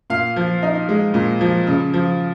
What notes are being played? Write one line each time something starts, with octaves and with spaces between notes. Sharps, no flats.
A#2 F5
F3
D#4
G#3
A#2
F3
C#3
F3